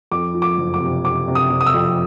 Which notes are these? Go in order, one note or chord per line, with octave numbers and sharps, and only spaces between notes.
F2 D6
F3
D6
F#1
D6
C3
C3 D6
C3
D#6
C3
D#6
E6
F2